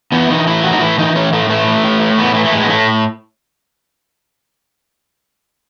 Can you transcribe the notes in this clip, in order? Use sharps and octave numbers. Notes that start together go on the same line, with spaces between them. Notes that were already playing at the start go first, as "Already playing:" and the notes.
E3 B3
E4
E3 D#4
A2 E4
A2 F#4
D#4
E3 E4
E3 D#4
A2 C#4
A2 A3
E3 A3
E3
A2
A2
E3 B3
E3 A3
A3
A2 G#3
B3
A2 A3